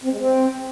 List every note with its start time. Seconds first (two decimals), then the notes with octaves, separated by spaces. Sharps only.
0.04 C4
0.12 G#3
0.19 C4